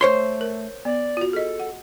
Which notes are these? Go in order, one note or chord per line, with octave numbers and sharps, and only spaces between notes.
A3 C5 C#5 C6
A#4
B3 D5
F4 F#4
G#4 A4 D#5
F#5